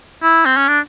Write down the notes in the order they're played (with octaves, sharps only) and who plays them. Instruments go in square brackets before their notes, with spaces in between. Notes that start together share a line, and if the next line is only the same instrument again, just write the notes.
[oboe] E4
C4
C#4
D4